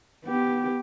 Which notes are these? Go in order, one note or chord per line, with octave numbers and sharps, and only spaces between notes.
B3 G4